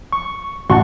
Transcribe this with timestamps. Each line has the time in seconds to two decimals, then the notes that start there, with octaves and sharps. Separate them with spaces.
0.12 C#6
0.70 A1 F#4 F#5 A5 C6 C#6